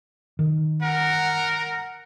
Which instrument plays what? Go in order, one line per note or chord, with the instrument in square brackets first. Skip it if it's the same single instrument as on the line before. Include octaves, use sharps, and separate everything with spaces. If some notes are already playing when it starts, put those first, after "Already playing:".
[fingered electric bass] D#3
[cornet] A#4 [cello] F#5